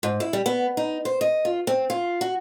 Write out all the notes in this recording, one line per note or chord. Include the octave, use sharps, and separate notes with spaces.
G#2
E4
G3
B3
D#4
C5
D#5
F4
C4
F4
F#4